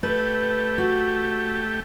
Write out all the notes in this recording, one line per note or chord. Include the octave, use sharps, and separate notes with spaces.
A3 G4 B4
F#4